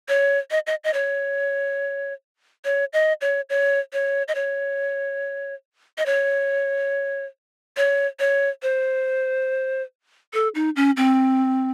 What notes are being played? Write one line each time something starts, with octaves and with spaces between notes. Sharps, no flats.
C#5
D#5
D#5
D#5
C#5
C#5
D#5
C#5
C#5
C#5
D#5
C#5
D#5
C#5
C#5
C#5
C5
A4
D#4
C#4
C4